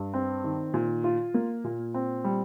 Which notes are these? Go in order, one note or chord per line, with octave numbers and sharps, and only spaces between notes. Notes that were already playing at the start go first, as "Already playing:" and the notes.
Already playing: G2
C4
D#3
A#2
F4
A#3
A#2
C4
G3